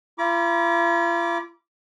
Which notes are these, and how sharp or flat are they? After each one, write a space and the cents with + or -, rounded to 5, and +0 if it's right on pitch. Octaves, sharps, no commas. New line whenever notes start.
F4 -45 B5 -45 D6 -15